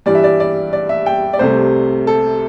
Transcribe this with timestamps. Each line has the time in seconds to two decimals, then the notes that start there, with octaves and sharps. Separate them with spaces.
0.06 G2 E3 G3 D5
0.15 E5
0.24 D5
0.40 D5
0.73 D5
0.89 E5
1.06 G5
1.33 D5
1.39 C2 C3 A3 C5
2.07 A4